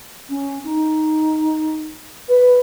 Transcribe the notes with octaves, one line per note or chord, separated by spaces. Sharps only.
C#4
D#4
B4